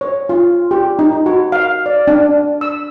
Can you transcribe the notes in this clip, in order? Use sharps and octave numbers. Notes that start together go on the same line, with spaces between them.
C#5
F4
G4
D#4
F#4
F5
D5
D4
E6